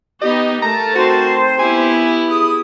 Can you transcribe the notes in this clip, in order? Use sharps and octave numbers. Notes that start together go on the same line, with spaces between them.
B3 D#4 G4 D#5
A3 A#4 A5 A#5
C4 D#4 F#4 C5
B3 E4 G4 G#5
G#4 D#6